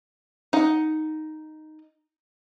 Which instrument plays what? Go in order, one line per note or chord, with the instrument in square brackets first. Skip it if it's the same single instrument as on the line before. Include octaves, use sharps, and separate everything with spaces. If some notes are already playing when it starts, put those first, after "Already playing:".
[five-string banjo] D#4 F#5